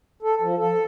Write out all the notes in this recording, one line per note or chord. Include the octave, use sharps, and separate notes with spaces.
A4
F3
A4